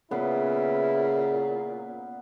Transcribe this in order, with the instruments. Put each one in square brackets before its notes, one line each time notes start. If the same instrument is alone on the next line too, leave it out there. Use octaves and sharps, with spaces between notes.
[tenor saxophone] A#2 [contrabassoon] C#3 [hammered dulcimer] B3 [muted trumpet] E4